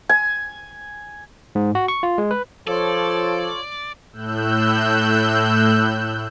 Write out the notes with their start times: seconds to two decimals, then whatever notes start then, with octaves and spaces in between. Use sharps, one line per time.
0.09 G#5
1.55 G#2
1.75 F#4
1.88 C#6
2.03 F4
2.18 G#3
2.31 B4
2.67 F3 F4 A4 C#5 D5
4.13 A2 E6 F#6 G6